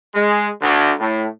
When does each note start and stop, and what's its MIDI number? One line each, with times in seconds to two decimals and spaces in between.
0.15 0.48 56
0.62 0.91 38
0.99 1.25 45